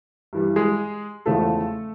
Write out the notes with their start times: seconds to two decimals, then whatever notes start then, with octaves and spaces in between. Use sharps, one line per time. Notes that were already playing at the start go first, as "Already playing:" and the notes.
0.33 G2 E3 G3
0.56 G#3 G#4
1.26 E2 C#3 F3 G#3 A3 A4